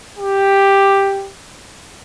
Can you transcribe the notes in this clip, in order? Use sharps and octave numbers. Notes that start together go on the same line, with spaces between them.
G4